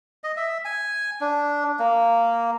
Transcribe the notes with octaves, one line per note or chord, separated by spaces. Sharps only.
D#5
E5
G#5
D4
A#3